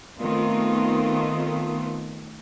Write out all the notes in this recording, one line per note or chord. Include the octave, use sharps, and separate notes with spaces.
D#3 A3 B3 C4 F4